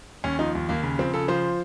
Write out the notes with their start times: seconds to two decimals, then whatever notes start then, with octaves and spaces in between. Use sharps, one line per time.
0.24 D#2 C#4
0.39 F3 D#4
0.55 D#2
0.69 D#2 A#3
0.83 C#3
0.99 F3 C4
1.14 C#3 A4
1.28 F3 C5